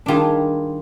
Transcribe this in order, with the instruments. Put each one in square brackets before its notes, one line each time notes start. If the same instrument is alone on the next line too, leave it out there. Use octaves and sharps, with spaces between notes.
[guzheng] D#3 G3 D4 F4 G#4